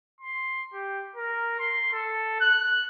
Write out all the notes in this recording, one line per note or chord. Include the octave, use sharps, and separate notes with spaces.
C6
G4
A#4
C6
A4
F#6